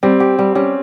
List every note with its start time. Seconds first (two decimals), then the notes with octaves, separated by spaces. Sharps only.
0.03 G3 C4
0.20 G4
0.39 G3
0.55 G3 C#4